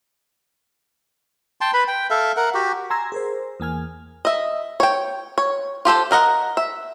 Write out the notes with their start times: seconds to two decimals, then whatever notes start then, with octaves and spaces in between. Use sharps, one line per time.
1.61 G5 A5 C6
1.74 B4 B5
1.88 G5
2.10 A4 E5 F5
2.37 A#4 F#5
2.54 F#4 G4
2.90 G#5 A#5 C6 E6 G#6 A#6
3.12 G#4 A#4 C5
3.60 E2 A#3 G#5 F6
4.25 D#5 E5
4.80 C#5 G5
5.38 C#5
5.85 F4 G4 A4 C5
6.11 D4 A#4 D#5 F#5
6.57 E5